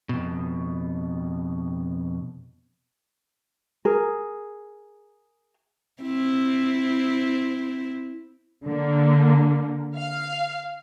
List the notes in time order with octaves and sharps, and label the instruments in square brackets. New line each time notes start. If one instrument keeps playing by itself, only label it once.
[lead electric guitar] F2 B2
[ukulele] G#4 A#4
[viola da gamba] C4 E4
[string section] D3 A#3
F5